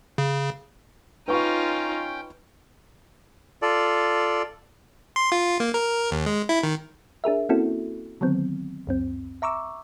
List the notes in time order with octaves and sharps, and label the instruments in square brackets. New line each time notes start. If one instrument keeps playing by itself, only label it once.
[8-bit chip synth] C#3
[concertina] C#4 G5 [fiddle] D#4 F4 [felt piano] B4 C#6
[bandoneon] F4 A4 D5
[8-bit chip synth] C6
F4
A#3
A#4
D#2
G#3
E4
D#3
[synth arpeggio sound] D4 G#4 A#4 E5
A#3 C4 C#4 E4 F#4 A4
D3 D#3 F#3 B3 C4
C#2 F#2 C4
E5 A#5 C#6 D6 E6